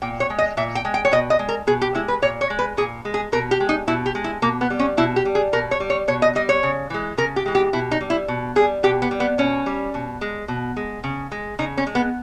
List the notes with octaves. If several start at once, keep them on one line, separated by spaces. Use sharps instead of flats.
A#2 G5
C#5
G#3
D#5
A#2 E5
G5
G#3
G5
C#5
B2 D#5
D#5
G#3
A#4
B2 G#4
G4
G#3 E4
B4
A#2 C#5
C#5
G#3
B4
A#2 G#4
G#3
G#4
B2 A#4
G4
G#3
D#4
B2 E4
G4
G#3
E4
B2 A#3
B3
G3
C#4
B2 E4
G4
G3
G#4
B2 A#4
C#5
G3
C#5
B2 C#5
D#5
G3 D#5
C#5
C#3
E3 G#3
C#3 A#4
G4
E3 G#3
G4
B2 E4
D#4
G3
E4
B2
G3 G#4
B2 G4
B3
G3
B3
B2 C#4
G3
B2
G#3
B2
G#3
C#3
G#3
C#3 D#4
C#4
G#3
B3